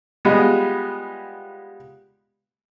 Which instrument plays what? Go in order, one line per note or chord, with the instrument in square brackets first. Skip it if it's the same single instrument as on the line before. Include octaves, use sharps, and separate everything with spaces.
[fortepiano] G3 G#3 B3 F4